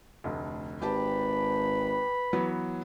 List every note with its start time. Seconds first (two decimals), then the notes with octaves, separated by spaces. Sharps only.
0.24 F1 D2
0.82 G#1 G4 B4 G5 A5 B5
2.33 E3 F#3 B3